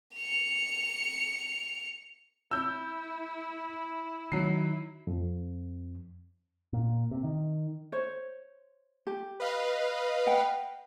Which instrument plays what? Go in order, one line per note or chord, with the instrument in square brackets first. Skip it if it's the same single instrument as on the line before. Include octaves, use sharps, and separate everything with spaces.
[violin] C#7 F7
[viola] E4 [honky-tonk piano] E6 G6
[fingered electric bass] D#3 [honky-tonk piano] F#3 C7
[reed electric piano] F2
[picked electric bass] A#2
C3
D#3
[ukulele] C5 C#5
G4
[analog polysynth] B4 D#5 F5
[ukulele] F#5 G5